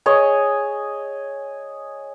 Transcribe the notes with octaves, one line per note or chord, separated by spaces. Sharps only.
G#4 C#5 D#5